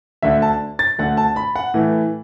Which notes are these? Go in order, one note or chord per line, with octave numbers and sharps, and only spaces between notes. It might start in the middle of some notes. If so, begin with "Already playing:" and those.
D2 D3 A3 E5
A5
A6
D2 D3 A3 F#5
A5
B5
F#5
A2 E3 A3